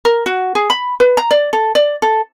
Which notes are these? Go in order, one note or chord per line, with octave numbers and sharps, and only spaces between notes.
A#4
F#4
G#4
B5
B4
A#5
D5
A4
D5
A4